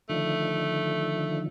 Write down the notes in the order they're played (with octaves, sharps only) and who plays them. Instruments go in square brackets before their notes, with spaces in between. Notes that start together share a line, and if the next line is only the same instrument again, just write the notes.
[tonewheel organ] D3 D#3 F3 [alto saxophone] A3